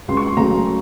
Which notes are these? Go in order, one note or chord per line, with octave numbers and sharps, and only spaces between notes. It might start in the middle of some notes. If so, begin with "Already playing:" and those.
C#2 C6
C#6
C6
C#3 F#3 A3 A#5